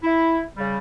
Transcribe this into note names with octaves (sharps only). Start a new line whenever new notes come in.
E4
C#3 G3